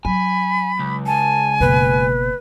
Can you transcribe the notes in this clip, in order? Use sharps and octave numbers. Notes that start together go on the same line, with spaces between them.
F#3 G#5 B5
C#2
G#5 A5
F#1 B2 B4